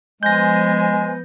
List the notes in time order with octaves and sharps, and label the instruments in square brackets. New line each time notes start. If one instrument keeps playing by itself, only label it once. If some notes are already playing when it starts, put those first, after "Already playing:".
[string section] F3 B3 [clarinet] G#3 [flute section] C5 G#5 [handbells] G6 A#6